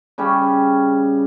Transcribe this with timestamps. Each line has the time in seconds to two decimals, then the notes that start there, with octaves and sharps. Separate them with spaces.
0.18 C#3 G3 C#4